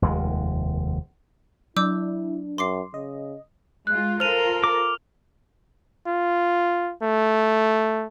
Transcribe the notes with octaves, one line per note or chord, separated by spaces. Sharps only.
F1 D#2 G#3
F#3 D4 E4 D6 E6 G6
F#2 C6 D6 C7
C#3 D#5
G#3 F4 F#6
F4 A4 A#4 C5 F6 D#7 F7
D6
F4
A3